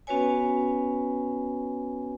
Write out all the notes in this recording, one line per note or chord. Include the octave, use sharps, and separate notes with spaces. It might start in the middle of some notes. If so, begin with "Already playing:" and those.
B3 C#4 F#4 B4 C#5 G#5